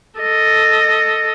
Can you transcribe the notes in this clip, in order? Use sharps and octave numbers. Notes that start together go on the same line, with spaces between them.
A4 D#5